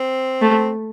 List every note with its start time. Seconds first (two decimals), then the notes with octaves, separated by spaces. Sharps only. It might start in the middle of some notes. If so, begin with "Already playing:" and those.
Already playing: C4
0.41 A3